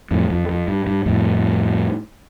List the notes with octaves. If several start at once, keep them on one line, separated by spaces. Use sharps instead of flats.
F2 A2
F2
F2
G2
G2
F2 A2